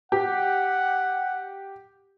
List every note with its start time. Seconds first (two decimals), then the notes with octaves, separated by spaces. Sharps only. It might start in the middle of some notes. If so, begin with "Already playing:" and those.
0.12 G4 F#5